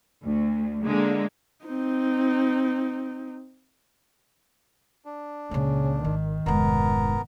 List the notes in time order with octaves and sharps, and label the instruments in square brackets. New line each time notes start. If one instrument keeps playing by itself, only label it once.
[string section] D2
D3 G#3 A#3
[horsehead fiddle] C4 D#4
[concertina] D4
[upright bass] C#2 A#2 [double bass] C#3
[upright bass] G#1 [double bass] D#3
[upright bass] F1 G#2 [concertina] B3 A#4